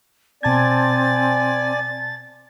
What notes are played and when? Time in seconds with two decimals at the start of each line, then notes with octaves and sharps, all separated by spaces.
0.43 B2 C4 D5 G#5 A5 G#6 A6